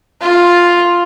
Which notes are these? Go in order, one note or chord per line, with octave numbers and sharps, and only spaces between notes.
F4